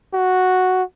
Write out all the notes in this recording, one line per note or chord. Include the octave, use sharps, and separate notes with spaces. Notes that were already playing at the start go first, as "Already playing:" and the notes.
F#4